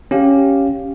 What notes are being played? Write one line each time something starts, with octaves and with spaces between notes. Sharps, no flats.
C#4 G4 F5